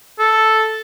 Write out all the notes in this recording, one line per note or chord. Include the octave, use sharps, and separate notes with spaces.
A4